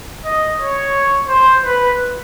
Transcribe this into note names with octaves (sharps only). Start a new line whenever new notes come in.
D#5
C#5
C5
B4